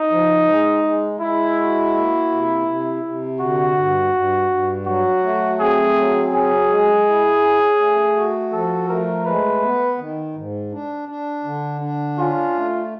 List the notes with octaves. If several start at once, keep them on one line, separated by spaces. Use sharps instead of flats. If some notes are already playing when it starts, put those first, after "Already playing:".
Already playing: D#4
F3
G#3
G#3
G#3 E4
F#4
A#3
C3
C3
C3
D3 F#4
G2
G2
G2
F#3 F#4
A3
C4 G#4
F#3
C#4 G#4
G#3
E4
C#4
A3
F#4
F3 A4
A3 A#4
G#3 B4
B3
D#3
G#2
D4
D4
D3
D4
C#4 F4
A3